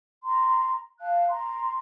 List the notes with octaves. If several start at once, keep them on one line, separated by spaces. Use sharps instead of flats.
A#5 C6
F5 A5 F#6
A#5 C6